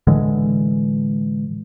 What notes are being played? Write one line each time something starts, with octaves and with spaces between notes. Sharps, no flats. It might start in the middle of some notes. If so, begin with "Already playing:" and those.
A2 D3 E3 G#3